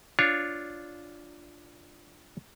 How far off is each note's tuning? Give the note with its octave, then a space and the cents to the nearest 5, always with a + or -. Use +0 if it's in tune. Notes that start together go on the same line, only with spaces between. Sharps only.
D4 +0 F4 +0 C#5 +0